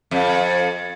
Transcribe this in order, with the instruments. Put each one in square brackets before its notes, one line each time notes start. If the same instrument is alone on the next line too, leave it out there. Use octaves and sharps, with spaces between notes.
[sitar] F2